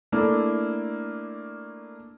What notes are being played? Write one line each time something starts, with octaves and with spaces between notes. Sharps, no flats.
A3 A#3 D4 E4